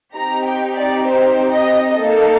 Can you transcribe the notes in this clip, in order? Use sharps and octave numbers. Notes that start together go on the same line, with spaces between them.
C4 D#4 G4 A#5
G5
D5
C5
D#5
A#3 D#4 A4